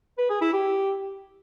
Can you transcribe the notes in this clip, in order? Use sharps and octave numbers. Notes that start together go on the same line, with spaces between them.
B4
G#4
E4
G4